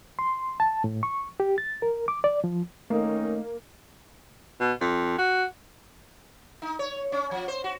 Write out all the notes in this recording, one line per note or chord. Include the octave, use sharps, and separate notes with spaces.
C6
A5
A2
C#6
G4
A6
A#4
D6
D5
F3
D#3 A3 A#3 C#4 D#4
B2
F2
F#4
D#4
C#5
C#4
F3
C5
F#4